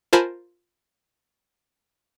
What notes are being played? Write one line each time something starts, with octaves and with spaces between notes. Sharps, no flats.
F4 A#4 C5 G#5 A5 B5